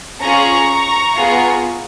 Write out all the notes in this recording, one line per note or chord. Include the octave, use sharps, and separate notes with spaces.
C#4 F4 G#4 A#5 C#6
B3 F4 G#4